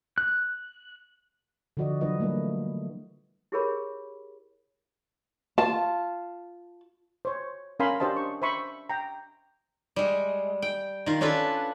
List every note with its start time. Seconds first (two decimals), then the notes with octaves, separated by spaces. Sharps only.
0.18 F#6
1.77 D3 F3 F#4 D5 D#5
2.01 E3 F#3 D4 F4 B4 D#5
2.20 G3 A3 A#3 E4 B4
3.52 E4 G4 G#4 A#4 C#5 B5
5.58 F4 A5
7.25 C5 C#5
7.80 C#4 A#4 F5 G#5 B5 C6
8.00 D4 G4 C5 D#5 A5
8.17 C#6
8.42 C5 E5 B5 C#6
8.89 G5 A#5
9.96 G3 G#3
10.62 G5
11.06 D#3 F4
11.21 C#4 D4 F4 A4 B4